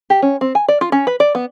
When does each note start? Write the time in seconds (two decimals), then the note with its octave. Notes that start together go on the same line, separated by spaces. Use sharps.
0.10 G4
0.22 C#4
0.41 C4
0.55 G#5
0.68 D5
0.81 F4
0.92 C#4
1.07 B4
1.20 D5
1.35 B3